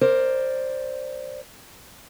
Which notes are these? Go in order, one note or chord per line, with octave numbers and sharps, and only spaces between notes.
A#4 C5 D5